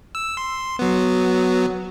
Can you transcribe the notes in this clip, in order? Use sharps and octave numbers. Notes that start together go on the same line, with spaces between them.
E6
C6
F#3 B3